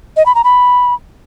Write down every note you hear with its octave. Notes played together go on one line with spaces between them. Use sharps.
D#5
B5
A#5
B5